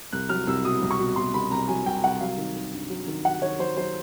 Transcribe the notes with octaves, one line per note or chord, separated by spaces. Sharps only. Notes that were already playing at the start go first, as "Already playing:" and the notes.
C2 F#6
F#3 F6
C2 E6
B2 D#6
C2
C#6
B2
B2 C6
C2 B5
C2 A#5
F#3 G#5
C2 G5
C2 F#5
F#3 F5
D#3
D#3
G2
F#3
D#3
F#3 F#5
D#3 C#5
F#3 C5
F#3 C5